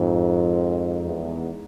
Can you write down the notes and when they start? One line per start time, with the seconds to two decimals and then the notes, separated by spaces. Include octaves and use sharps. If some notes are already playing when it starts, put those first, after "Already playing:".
Already playing: F2 G#2 D#4
1.03 E2